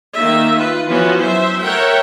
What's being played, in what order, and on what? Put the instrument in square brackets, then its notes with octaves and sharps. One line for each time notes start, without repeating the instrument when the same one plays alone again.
[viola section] D#3 A#3 E5
F4 B4
E3 F3 B3 C#4 F4 F#4
F#3 C5 E5
A#4 C#5 E5 F#5 G5